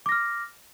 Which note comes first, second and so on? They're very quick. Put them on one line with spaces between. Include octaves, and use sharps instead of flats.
D6 A#6 F6